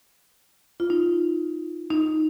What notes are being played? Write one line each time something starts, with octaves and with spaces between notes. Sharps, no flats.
F4
D#4
D#4